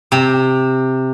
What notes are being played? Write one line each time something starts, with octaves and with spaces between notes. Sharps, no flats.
C3